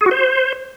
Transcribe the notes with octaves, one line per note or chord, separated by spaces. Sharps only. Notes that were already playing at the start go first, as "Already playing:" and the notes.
G#4
F#4
C5